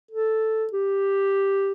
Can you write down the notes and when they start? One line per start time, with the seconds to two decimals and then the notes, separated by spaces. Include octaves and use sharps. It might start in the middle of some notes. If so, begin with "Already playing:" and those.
0.11 A4
0.73 G4